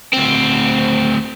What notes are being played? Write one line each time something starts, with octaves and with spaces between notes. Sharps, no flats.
D2 C4